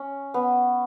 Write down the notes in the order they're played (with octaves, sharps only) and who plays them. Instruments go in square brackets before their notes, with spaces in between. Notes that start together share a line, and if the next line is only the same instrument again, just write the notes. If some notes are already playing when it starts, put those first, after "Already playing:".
Already playing: [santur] C#4
B3